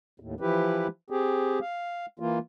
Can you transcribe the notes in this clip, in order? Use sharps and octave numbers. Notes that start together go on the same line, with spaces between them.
D#2 A2
E3 F3 E4 G4 B4
C4 G4 G#4
F5
E3 A#3 F4